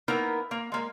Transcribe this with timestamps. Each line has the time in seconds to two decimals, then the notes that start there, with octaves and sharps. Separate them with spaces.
0.08 A#3 B3 D#4 E4 A#4
0.51 A#3
0.72 G#3 A#3